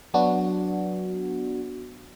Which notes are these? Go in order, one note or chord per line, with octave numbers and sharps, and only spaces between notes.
F#3 B3 D4 F#4